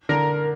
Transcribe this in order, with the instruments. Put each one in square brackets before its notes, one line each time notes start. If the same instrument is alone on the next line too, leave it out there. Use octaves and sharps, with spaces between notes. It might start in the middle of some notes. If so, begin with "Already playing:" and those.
[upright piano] D3 [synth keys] A#4